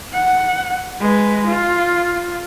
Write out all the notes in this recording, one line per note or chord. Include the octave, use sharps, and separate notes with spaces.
F#5
G#3 B4
F4